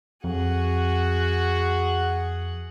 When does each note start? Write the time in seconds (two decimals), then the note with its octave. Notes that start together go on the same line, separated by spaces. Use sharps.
0.24 F2 F#4 G#4 F#5